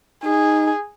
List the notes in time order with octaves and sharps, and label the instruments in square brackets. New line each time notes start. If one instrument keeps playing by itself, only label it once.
[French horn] D#4 [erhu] G#4